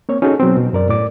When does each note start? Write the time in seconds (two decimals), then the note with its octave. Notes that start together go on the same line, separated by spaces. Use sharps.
0.09 A#3 C4 C#5
0.22 C#4 D#4 F#4 G#4 A4
0.40 B2 F#3 B3 C4
0.57 B2
0.73 F#2 A#4 D5
0.89 A2 D5 D6